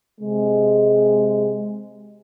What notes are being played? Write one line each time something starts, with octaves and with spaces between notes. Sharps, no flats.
C3 G#3